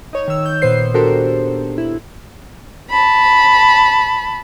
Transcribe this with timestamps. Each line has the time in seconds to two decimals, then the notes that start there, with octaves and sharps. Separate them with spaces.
0.13 D#4 C#5
0.28 D#3 E6
0.46 G6
0.62 A#2 B3 C5 C7
0.94 D4 F#4 G4 A4 A#4 C5
1.78 E4
2.90 A5 B5